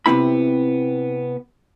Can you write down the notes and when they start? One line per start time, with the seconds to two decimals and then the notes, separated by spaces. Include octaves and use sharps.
0.06 C3 B3 C4 E4 B5